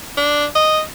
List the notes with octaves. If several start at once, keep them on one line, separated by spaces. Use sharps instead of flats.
D4
D#5